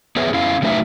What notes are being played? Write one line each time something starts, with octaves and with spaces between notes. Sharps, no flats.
B3 G#4 B4 C#5 E5
C#4 E4 F5
F#3 A3 D#4 B4 E5